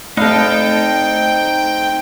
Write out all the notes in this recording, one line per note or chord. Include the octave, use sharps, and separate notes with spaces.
A3 C4 D#4 A4 F5 G5